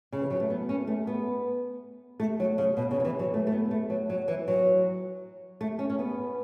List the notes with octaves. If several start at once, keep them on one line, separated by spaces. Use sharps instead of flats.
C#3
E3
F#3
A3
B3
C#4
A3
B3
A3
F#3
C#3
B2
C#3
F#3
E3
F#3
A3
A3
B3
A3
F#3
F#3
E3
F#3
A3
C#4
C#4
B3